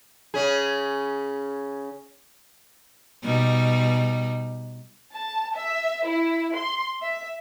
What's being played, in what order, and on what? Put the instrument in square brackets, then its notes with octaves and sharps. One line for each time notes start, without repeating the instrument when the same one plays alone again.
[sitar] C#3 C#4 G#4
[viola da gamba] B2 G3 D#4
[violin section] A5
E5
E4
C6
E5